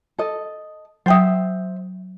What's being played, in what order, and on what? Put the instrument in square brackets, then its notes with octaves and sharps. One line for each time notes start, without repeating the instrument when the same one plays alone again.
[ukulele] A4 D#5
[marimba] F#3 G5 D#6 [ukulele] C5 E5